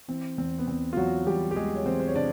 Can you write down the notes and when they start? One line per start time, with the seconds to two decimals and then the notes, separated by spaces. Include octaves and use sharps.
0.08 E3 C4
0.38 E2 C4
0.59 B3
0.68 E2 C4
0.93 F4
0.97 E2 F#3 F#4
1.27 E2 G3 G4
1.51 G4
1.56 E2 G#3 G#4
1.75 C#5
1.86 E2 C4 C5
2.00 C5
2.08 C#5
2.15 C3 D4 D5